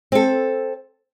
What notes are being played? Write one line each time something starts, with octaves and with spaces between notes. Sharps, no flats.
C4 A4